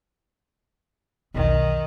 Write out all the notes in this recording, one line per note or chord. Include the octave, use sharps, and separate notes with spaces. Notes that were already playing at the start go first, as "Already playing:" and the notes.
B1 E2 D#3